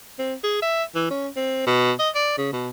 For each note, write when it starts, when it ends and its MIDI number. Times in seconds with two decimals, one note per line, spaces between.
0.19 0.34 60
0.44 0.59 68
0.62 0.84 76
0.95 1.09 52
1.10 1.28 61
1.36 1.66 60
1.67 1.92 47
2.00 2.09 75
2.15 2.35 74
2.38 2.52 49
2.53 2.69 47